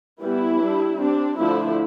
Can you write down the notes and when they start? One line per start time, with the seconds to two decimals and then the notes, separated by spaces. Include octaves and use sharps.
0.22 E3 G3 B3 E4
0.61 G3 D4
0.99 G3 C4 D4
1.38 D3 F3 A3 D4 E4